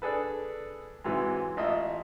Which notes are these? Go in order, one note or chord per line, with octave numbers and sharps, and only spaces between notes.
D4 G#4 A4 B4
G#2 C3 E3 F#3 G#3
A1 F4 D#5 E5